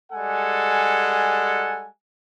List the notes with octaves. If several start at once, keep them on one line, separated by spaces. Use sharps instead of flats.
G3 G#3 A4 F#5 G#5